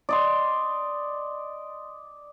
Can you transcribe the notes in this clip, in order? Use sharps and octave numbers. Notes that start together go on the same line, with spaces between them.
D5 D#5 C6